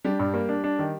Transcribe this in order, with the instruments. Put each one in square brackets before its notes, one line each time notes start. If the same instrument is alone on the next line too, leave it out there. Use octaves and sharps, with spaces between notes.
[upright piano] G3 G4 [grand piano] D4
[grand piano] G2
A#3
D4
D4
D#3